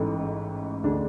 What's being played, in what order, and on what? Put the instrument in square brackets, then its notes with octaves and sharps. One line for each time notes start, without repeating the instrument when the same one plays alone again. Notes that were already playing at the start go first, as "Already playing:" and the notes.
Already playing: [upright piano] A1 G#2 E3 A3
D2 D3 G#3 D4